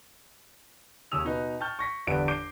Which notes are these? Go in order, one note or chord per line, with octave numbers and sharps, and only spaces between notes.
D#2 C#3 C#4 D#6 E6 F7
B2 D#4 B4
G5 A5 C#6 F6 G6
C#6 A#6 B6
G1 E2 D4 G4 B4 D7
D6 G6 C7 D7